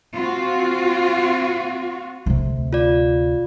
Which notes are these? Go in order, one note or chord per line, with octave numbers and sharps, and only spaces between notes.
C4 F4 F#4
D2 C3
F4 D5